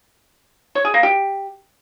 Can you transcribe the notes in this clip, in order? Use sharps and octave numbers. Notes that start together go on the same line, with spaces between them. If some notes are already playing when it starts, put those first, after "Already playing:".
C#5
G#4
A#3
G4